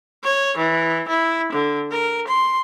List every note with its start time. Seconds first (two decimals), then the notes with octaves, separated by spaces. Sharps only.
0.24 C#5
0.57 E3
1.08 E4
1.53 D3
1.91 A#4
2.27 C6